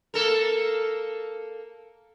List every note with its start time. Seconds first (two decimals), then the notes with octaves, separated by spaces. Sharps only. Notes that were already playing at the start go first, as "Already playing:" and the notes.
0.14 A#3 A4 A#4